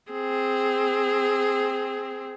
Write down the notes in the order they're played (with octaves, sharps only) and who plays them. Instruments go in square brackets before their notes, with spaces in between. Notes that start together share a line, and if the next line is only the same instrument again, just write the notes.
[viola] C4 G#4